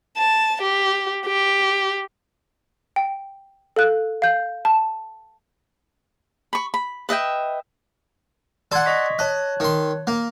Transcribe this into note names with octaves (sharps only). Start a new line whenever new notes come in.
A5
G4
G4
G5
A4 F5 F#6
F5 G6
A5
B5 C#6
B5
B4 D#5 E5 G5
A4 D5 F#5 C6 G#6
D#5 C#6 B6
C#5 D#5 A5 F#6
D#3 C6
A#3